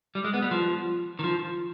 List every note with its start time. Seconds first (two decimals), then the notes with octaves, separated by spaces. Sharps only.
0.15 G3
0.24 G#3
0.34 B3
0.42 G3
0.51 F3
1.19 D#3
1.24 F3